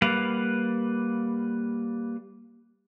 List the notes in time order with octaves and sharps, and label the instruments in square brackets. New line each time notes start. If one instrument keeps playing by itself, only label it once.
[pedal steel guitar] G3 A#3 B4 F5 F#5